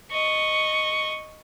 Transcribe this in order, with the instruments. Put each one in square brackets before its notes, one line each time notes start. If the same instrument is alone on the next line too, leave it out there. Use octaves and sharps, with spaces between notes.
[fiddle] D#5 C#6